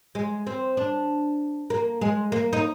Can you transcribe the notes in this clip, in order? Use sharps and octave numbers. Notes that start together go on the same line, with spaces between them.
G#3
C4
D4
A#3
G#3
A#3
D#4